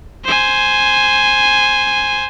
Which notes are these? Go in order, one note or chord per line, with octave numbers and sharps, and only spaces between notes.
C5 G#5